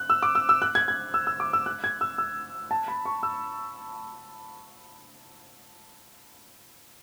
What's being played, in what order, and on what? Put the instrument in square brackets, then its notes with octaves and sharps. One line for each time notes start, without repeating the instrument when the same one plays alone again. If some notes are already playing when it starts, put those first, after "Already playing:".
Already playing: [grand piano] F#6
E6
D6
E6
E6
F#6
G#6
G#6
E6
E6
D6
E6
F#6
G#6
E6
E6
A5
B5
C#6
E6